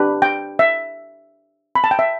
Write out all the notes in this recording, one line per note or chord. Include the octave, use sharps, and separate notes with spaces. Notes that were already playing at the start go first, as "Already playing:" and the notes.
Already playing: D4 G4 B4
G5
E5
B5
A5
G5
E5